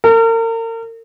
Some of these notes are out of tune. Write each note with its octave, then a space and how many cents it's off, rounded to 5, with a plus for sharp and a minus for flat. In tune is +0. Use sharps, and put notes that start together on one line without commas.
A#4 -40